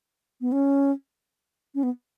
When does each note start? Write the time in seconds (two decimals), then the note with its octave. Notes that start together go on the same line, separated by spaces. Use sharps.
0.41 B3
0.52 C#4
1.75 C#4
1.83 B3